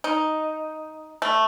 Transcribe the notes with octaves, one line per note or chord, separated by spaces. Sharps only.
D#4
A3